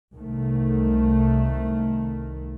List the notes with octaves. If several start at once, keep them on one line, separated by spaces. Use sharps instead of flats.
C2 D#3 A3